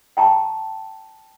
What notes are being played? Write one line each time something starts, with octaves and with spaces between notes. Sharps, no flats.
G5 A5 A#5 C#6